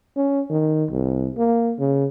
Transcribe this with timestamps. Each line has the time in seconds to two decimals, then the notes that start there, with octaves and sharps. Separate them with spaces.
0.16 C#4
0.50 D#3
0.91 C2
1.38 A#3
1.79 C#3